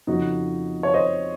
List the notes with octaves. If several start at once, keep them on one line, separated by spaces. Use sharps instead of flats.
F2 C#3 F3 D#4 F#4
C#5
C5 D#5